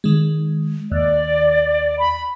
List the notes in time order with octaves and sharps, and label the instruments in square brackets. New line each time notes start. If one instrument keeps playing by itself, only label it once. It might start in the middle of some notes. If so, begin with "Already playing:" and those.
[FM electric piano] D#3 G#3
[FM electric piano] D#2 [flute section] D5
[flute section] B5